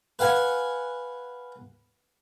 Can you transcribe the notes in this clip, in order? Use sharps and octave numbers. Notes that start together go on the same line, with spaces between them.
B4 F5 F#5 G#5